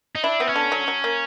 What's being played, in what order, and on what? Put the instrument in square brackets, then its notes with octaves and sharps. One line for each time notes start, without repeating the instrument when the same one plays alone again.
[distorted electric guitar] D#4
[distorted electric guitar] D4 [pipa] E4
[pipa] B3 [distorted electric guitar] C4
[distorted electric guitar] C#4
[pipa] D3
F#3
F#3
A#3